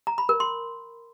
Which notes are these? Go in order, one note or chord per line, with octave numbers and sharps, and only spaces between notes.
A#5
B5
A#4
C6